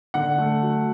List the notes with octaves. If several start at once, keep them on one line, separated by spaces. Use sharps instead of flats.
D3 F#5
A3
F#3